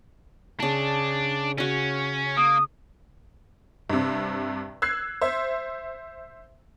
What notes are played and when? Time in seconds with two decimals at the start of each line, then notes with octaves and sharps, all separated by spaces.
0.60 C#3 D4 A5
1.58 C#3 C#4 F#4
2.37 A#3 D#6
3.90 G2 C3
4.82 E6 F#6 G#6 C7
5.21 C5 E5